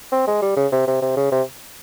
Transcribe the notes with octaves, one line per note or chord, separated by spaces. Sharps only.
C4
G#3
G3
C#3
C3
C3
C3
C#3
C3